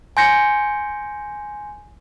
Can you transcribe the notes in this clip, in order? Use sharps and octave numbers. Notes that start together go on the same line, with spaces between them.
G#5 C6 G6 A#6 C#7